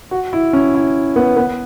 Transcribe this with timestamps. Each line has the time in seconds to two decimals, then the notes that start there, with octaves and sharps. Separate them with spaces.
0.11 F#4
0.33 E4
0.53 C#4
0.75 E4
1.16 B3
1.37 B3